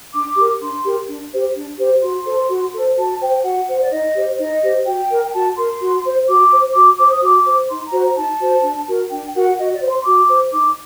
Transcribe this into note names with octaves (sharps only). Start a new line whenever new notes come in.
D4 D6
G4 A#4
D4 C6
G4 A#4
D4
G4 C5
D4
G4 C5
F#4 C6
A4 C5
F#4
A4 C5
F#4 A5
C5 G5
F#4 F#5
C5
D5
D#4 D#5
G4 C5
D#4 D#5
G4 C5
F#4 G5
A#4
G5
F#4 A5
A#4 C6
F#4
C5
F#4 D6
C5
F#4 D6
C5 D6
D#6
F#4 D6
C5
D#4 C6
A#5
F#4 C5
A#5
D#4 A5
F#4 C5
D4
F#4 A#4
D4 G5
F#4 A#4 F#5
F#4 D#5
D5
C5
C6
F#4 D6
C5
D#4 D6